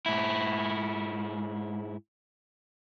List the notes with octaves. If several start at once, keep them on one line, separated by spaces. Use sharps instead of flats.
G#2 E4